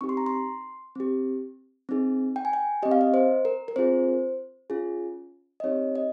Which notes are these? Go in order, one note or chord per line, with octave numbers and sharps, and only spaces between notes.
C4 D#4 G4 C#6
C6
A#5
C6
C4 G4
C4 D#4 G#4
G5
G#5
G5
C4 G4 D#5
F5
D#5
C5
A#4
A#4
C4 F4 G#4 C5
C#4 F4 G#4
D#5
C4 D#4 G4 C#5
D#5